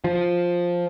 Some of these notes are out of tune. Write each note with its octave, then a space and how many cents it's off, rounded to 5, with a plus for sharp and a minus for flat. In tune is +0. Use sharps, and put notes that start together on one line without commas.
F3 +5